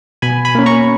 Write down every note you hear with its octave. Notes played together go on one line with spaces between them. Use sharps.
B2 G#5 B5
G#5 B5
A#3 C#4
A#5 C#6